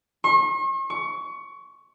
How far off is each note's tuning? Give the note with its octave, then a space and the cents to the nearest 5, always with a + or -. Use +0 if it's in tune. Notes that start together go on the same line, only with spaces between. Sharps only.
C#6 -45
C#6 +25